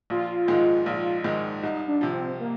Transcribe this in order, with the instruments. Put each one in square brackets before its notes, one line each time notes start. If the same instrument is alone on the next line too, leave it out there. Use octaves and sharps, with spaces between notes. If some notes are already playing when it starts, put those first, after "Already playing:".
[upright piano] A#1 [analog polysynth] F4
[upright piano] G#2 D#3 G#3
A#1
G#2 D#3 G#3
[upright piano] C2 [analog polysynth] D#4
[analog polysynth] D4
[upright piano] C3 F3
[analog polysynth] C4
A#3